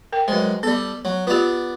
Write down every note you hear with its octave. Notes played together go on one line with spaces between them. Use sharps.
A#4 G5
F#2 G#3 B4 C5
G3 B3 A4
F#3
B3 F4 G4 D5